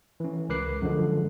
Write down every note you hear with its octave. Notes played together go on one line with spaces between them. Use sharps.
E3 C#4
C#2 A#4 B4 D6 F#6 C7
F#2 D3 F3 G#3